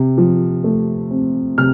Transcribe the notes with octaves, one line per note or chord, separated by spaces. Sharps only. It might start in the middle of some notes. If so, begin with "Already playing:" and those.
Already playing: C3
F3
A3
C4
C3 F6